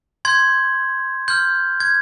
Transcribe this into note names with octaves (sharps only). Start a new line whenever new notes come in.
C6 G6 G#6
C6 F6 G6
G#6